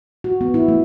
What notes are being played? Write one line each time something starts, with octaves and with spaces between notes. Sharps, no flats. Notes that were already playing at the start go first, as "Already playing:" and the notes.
F#4
B3
E4
A3